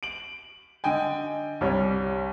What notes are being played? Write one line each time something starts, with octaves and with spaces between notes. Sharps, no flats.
D7 F#7
D3 D#5 G5 G#5
C2 G3 C#5